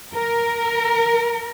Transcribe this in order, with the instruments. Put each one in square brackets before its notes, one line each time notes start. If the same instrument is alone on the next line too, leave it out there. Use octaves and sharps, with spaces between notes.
[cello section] A#4